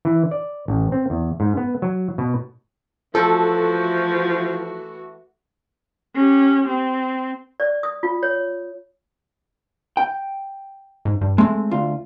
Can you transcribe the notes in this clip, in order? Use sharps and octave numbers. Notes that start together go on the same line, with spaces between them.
E3
D5
A1
C4
E2
G#2
B3
F#3
B2
E3 F3 A3 F#4 A4
C#4 G4
C4
D5
D#6
F4
C#5
G5
G#2
G2
G#3 A3 C4
D2 F4